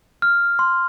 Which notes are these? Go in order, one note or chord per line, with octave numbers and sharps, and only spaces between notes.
F6
C6